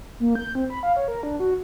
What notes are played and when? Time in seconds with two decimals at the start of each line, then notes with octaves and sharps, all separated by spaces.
0.20 A#3
0.35 G6
0.55 C4
0.70 B5
0.83 F5
0.96 C#5
1.08 A#4
1.23 D4
1.40 F#4